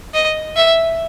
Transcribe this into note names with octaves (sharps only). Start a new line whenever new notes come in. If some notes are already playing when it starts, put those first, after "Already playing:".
D#5
E5